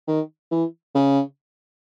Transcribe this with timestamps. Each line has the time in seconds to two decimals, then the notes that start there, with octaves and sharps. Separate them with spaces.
0.07 D#3
0.51 E3
0.95 C#3